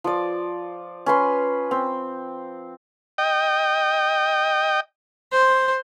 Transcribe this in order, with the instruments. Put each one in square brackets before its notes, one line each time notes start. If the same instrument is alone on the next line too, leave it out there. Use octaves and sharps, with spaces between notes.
[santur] F3 D5
C#4 B4 C6
C4
[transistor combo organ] D#5 G5
[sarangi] C5